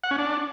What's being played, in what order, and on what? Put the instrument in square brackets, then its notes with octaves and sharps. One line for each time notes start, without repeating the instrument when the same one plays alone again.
[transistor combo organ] F#5
C#4
D4